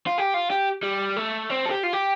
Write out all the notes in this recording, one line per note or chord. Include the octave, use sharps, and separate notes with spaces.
F4
G4
F4
G4
G3
A3
C4
A4
G4
F4
G4